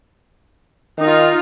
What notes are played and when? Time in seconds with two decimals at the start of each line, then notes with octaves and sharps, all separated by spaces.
0.98 D#3 D#4 F4